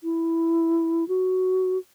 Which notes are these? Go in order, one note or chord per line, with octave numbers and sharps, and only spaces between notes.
E4
F#4